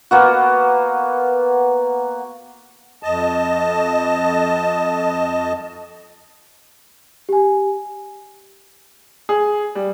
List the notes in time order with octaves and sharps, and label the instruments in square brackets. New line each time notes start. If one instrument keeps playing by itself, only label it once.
[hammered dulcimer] A#3 B3 F#4
[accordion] F2 D#5 A5
[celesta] G4 G#5
[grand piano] G#4
G3